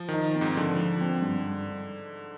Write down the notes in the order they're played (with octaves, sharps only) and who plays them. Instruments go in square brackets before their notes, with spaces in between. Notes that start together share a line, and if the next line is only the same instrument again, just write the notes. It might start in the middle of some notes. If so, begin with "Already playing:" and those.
Already playing: [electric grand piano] F3
D#3
[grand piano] D#4
C4
[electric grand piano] G#2
[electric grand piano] D3 [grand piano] F3
[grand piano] F3
C4
G2